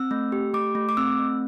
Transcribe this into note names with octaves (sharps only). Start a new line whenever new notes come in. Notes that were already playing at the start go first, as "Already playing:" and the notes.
Already playing: C4 E6
A3
G4
A3 D6
A3
D6
C4 E6
A3